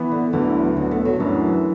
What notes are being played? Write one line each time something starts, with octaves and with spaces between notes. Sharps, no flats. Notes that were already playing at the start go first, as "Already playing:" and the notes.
Already playing: E3 B3 B4
D3
D2 D3 E3 F#3 B3
D2 D3 F#3 B3 D4
A3
F#3
F#2 E3 F#3 D4 F#4